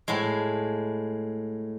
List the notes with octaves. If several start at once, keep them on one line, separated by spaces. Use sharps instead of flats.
A2 G#3